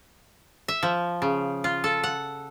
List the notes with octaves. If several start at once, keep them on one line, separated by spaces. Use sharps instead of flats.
E5
F3
C#3
F4
A4
F#5